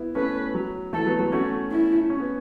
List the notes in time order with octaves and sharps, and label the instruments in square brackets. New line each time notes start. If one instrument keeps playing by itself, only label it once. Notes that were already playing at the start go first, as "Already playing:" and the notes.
Already playing: [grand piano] B3 E4
[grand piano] A3 C#4 [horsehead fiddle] B4
[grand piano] F#3
[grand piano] E3 A3 [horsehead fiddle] A4
[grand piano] F#3 B3
F#3 B3
[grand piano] A3 C#4 [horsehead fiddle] F#4
[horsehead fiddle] E4
[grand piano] C#4
B3